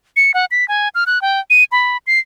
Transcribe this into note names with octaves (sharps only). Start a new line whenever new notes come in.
C#7
F#5
B6
G#5
F6
F#6
G5
D#7
B5
C7